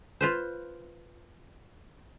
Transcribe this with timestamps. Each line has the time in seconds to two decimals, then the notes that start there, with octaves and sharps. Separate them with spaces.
0.21 F4 B4 C5